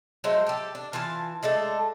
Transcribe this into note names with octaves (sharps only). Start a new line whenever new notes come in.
F#3 G#3 A3 C5
G4 A4
D4
E3 F4 G#5 A5
G#3 A3 D4 A4